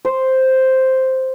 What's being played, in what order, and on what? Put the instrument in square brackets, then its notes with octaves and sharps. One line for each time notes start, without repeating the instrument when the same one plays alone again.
[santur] C5